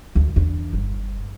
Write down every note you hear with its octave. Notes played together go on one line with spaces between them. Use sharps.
D2
E2 D4
G1